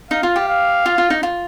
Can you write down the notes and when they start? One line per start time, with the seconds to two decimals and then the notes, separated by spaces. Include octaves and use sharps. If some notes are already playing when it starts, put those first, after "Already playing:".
0.11 D#4 F5
0.23 F4
0.36 G4
0.48 F5
0.86 F4
0.98 F4
1.10 D#4
1.23 F4